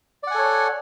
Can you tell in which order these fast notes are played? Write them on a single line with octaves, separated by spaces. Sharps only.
D5 F#5 G#5 A4 C#5